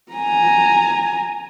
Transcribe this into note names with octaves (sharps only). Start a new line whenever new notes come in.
G#5 A#5